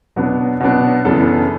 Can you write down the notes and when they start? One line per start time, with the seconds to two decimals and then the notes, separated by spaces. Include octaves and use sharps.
0.16 B2 F#3 B3 D4
0.60 B2 F#3 B3 D4
1.05 F#2 C#3 E3 B3 D4 A4
1.20 A4